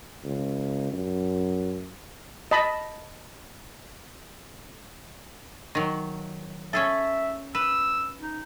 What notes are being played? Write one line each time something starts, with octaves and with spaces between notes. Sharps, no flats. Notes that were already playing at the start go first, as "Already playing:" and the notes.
C#2
F#2
D#5 A5 B5
D#3 F#3
C#4 G#4 A4 E5
B4 E6
D#4